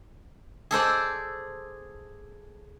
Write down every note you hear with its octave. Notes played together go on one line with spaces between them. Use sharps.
G#4 A4 C5 D5